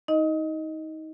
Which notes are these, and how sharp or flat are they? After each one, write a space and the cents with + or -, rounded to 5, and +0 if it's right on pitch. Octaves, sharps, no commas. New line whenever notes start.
D#4 +25 D#5 +0